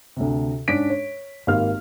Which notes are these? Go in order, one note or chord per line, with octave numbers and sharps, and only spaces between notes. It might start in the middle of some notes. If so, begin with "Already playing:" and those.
D2 C3
G#2 C#4 D4 B6 D7
C#5
G#1 A#3 G4 F5 F6